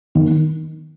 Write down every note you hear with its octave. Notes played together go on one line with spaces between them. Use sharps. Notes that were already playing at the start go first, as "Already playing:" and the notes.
D#3